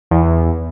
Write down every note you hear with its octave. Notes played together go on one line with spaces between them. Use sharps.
E2